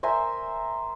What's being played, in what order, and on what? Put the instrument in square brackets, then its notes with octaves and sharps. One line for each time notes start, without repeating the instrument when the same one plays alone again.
[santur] A#4 C5 E5 G#5